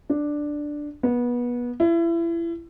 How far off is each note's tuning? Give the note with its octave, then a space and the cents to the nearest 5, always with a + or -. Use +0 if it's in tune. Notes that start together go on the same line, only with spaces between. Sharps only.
D4 +5
B3 -25
E4 +30